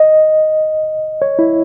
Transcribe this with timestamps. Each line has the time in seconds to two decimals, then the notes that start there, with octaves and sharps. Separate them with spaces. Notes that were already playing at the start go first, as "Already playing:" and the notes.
Already playing: D#5
1.22 C#5
1.39 E4